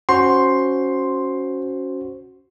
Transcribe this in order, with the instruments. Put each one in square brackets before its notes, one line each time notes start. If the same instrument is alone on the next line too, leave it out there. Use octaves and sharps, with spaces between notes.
[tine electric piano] C#4 F#4 C5 [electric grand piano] C6